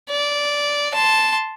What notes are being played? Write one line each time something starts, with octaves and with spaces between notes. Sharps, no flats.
D5
A5 C6